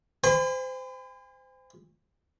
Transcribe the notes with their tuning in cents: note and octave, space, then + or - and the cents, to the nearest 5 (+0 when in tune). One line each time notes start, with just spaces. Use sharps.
C5 -25 G#5 -45 B5 +45